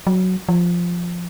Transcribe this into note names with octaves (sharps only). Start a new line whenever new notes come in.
F#3
F3